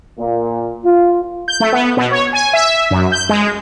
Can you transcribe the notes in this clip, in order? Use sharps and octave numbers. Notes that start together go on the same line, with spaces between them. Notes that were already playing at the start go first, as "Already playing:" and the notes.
A#2
F4
G6
A3
B3
B2
C#5
G#5
E5
F#2
G6
G#3